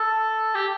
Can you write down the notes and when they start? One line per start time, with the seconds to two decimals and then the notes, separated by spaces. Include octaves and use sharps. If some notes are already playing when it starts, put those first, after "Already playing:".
Already playing: A4
0.55 G4